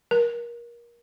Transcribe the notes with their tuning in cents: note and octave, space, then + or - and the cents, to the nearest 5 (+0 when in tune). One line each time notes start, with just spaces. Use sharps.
A#4 +25